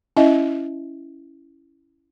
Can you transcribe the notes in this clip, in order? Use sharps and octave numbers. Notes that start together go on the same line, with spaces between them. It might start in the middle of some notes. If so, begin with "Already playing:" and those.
C#4 E4 D#5 E5